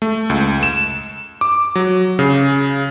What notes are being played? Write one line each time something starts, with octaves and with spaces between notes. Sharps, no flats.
A3
C#2
E7
D6
F#3
C#3